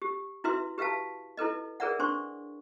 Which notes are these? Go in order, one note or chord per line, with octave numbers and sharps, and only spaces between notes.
G4
E4 F#4 B4 E5 C6
G4 B4 E5 F5 A5
E4 A4 B4 D#5
G#4 A#4 B4 D5 E5 F#5
D4 C5 C6 C#6